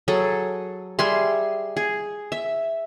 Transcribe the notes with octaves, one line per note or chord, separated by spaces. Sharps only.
F#3 G#4 A4
G3 G#4 E5 C6
G#4
E5